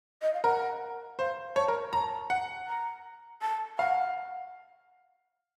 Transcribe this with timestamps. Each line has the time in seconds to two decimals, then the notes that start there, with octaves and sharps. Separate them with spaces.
0.22 D#5
0.34 F5
0.44 A#4 F#5
1.19 C5 F5
1.56 C#5 A5
1.68 A#4
1.93 A5 A#5
2.30 F#5
2.67 A#5
3.41 A5
3.79 F5 F#5